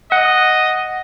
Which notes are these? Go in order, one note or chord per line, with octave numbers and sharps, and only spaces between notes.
D#5 F#5